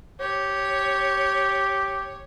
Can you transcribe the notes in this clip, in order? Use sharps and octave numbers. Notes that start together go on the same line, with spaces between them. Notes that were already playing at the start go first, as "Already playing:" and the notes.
G4 C#5